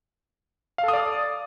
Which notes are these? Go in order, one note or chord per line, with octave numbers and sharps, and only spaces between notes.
A4 D5 F5 D#6